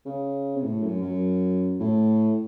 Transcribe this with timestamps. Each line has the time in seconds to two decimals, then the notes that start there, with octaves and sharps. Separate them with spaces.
0.05 C#3
0.56 C3
0.63 A2
0.83 F#2
1.01 F#2
1.80 A2